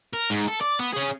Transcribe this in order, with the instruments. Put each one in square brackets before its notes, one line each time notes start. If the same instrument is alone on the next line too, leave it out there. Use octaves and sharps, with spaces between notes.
[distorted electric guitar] A#4
G#2
A4
D5
B3
C#4 G#4